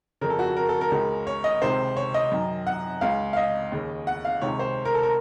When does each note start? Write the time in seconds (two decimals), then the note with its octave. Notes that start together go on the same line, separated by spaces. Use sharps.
0.21 F2 C#3 A#4
0.30 A4
0.39 F#4
0.57 A#4
0.69 A4
0.81 A#4
0.92 C#2 C#3
1.27 C#5
1.44 D#5
1.61 C#2 C3 D#3 C5
1.97 C#5
2.14 D#5
2.32 F#2 D#3
2.67 F#5
3.01 C#2 C#3 F5
3.33 F5
3.37 D#5
3.72 D#2 C#3
4.07 F#5
4.25 F5
4.41 C#2 C3 D#3 C#5
4.59 C5
4.85 A#4
4.94 A4
5.03 A#4